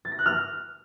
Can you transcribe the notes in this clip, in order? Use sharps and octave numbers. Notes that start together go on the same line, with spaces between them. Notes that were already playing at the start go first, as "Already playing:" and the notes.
A6
A#6
F#6
F6